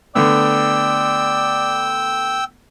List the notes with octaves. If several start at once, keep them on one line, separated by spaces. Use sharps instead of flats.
D3 A3 B3 D5 G5 E6